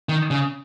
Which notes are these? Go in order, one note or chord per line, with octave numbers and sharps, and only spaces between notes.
D#3
C#3